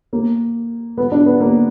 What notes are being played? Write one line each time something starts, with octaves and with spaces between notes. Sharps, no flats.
A#3
B3
D4
B3
A#3